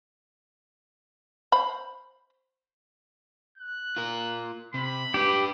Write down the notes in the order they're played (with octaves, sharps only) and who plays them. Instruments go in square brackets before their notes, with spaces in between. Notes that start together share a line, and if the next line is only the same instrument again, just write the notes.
[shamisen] C5 B5
[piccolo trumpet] F#6
[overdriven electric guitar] F4 A#4
[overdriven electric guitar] C3 [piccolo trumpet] B5
[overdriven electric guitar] D4 B4 [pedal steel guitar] G4